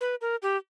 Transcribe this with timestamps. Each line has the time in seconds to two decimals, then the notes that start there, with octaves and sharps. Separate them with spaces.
0.01 B4
0.21 A#4
0.42 G4